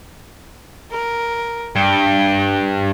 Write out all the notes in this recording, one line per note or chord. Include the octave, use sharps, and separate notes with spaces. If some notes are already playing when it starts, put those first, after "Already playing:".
A#4
G2 G5